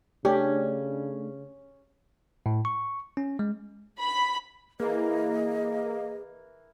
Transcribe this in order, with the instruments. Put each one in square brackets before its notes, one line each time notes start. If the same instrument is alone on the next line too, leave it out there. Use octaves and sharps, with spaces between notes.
[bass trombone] C#3 [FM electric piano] A3 D4 [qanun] C#4 [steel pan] G4
[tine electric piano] A2
C#6
C#4
G#3
[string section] B5
[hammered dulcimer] E3 A#4 [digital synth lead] A#3 [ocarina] G#4 [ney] D#5